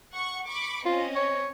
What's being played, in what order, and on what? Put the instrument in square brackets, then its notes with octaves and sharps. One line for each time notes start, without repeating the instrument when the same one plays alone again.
[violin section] F#5 C#6
B5 C#6 D6
[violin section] C4 C#4 D#5 [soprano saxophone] F4
[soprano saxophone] C#5